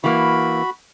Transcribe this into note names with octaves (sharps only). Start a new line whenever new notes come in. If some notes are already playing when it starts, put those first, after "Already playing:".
E3 A#3 F#4 B5